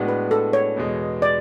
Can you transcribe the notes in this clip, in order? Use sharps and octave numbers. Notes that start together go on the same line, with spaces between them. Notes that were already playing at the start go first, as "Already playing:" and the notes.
Already playing: A2 G#3 B3 D4 F#4
B4
A4
C#5
E2 B2 G#3
D5